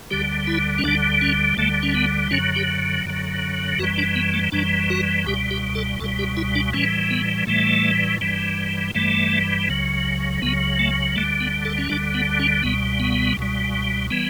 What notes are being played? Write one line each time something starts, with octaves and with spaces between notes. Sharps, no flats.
D2 D3 G3 G4
E4
C#4
D2 D3 G3 D4
C#4
D2 D3 G3 A3
C#4
B3
F#2 D3 F#3 C#4
G4
F#2 D3 F#3
F#2 E3 G3 F#4
D4
B3
A3
F#2 E3 G3 D4
F#4
C#2 B2 G3 G4
G4
A4
C#2 B2 G3 A4
G4
E4
D4
A2 E3 G3 C#4
B3
A2 E3 G3 A3
G2 E3 G3
G2 E3 G3 A3
C#2 C#3 F#3
C#2 C#3 F#3 B3
A3
D2 D3 G3 A3
B3
A4
C#4
D2 D3 G3 D4
B3
C#4
C#2 B2 G3 B3
B3
C#2 B2 G3
E3 G3 B3